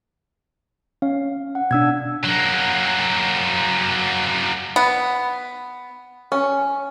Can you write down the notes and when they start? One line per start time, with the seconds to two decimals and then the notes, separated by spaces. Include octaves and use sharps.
1.02 C#4 F5
1.55 F#5
1.71 B2 D4 E6 G#6
2.24 F#3 A#3
4.76 B3
6.32 C#4